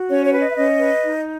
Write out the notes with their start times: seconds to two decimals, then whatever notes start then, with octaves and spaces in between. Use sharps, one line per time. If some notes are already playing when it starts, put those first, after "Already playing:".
Already playing: F#4
0.10 C#4 C#5
0.25 C#5
0.33 B4
0.40 D#5
0.49 E5
0.56 C#4 D#5
0.79 B4
1.02 D#4